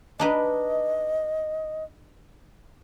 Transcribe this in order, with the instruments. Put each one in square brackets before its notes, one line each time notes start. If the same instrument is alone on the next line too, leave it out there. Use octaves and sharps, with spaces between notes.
[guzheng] D4 D#4 B4 [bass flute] D#5